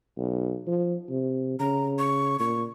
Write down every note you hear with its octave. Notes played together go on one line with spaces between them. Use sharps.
B1
F3
C3
C#3 A#5
C#6
A#2 C#6